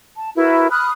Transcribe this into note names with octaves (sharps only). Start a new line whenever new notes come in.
A5
E4 F#4 A#4 B4
B5 D#6 F6 F#6